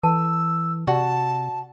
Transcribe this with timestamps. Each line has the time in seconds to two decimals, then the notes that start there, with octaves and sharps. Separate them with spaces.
0.03 E3 A4 A5 E6
0.87 C3 F#4 D5 A5